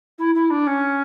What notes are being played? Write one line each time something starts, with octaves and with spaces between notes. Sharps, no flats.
E4
E4
D4
C#4